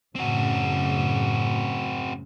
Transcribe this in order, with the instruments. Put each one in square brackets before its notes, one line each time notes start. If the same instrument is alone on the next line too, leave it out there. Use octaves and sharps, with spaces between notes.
[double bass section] F#2 A2 C#3 [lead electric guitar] C4 F#4